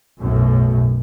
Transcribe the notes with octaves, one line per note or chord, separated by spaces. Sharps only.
B1 F#2 A2